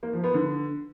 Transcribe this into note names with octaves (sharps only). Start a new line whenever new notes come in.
A#3
F3
B3
D3